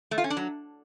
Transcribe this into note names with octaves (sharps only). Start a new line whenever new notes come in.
A3
F4
C#4
D4
F#3